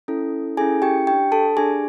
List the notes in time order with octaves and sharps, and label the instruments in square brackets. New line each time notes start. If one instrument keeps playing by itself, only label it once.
[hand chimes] C#4 E4 A4
G#4 A4 G#5
C#4 E4
G4 G5
G4 G5
D4
A4 A5
D4 G4 G#4 G#5